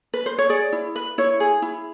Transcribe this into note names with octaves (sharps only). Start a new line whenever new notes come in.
B4
C5
C#5
G#4 D5
E4
B4
E4 C#5
G#4
E4